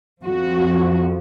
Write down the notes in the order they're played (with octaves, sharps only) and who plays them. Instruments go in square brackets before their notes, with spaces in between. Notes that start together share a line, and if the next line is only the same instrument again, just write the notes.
[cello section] F2 F3 F#4